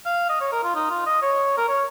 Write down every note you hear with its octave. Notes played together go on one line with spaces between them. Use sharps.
F5
D#5
C#5
A#4
F4
D#4
F4
D#5
C#5
A#4
C#5